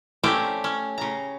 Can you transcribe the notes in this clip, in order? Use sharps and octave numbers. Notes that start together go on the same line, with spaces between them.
A3 C4 C#4 G4 D5 E5
C#4
C#3 A#5